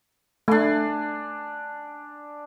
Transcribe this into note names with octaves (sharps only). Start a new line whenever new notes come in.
A3 D4 G#5